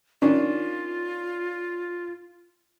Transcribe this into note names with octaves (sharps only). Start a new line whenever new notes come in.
D#3 C#4 D4 F4